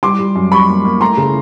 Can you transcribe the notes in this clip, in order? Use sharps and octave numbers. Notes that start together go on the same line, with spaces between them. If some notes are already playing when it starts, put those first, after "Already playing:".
G3 C6 D6
G3
F#2
G3 B5 C#6
A#3
A#3
A3 A#5 C6
C#3